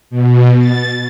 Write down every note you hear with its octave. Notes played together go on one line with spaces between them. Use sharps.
B2
A6